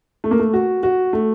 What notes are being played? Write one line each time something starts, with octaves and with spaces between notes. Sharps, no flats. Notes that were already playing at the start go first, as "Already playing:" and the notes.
A3
A#3
A3
F#4
F#4
A3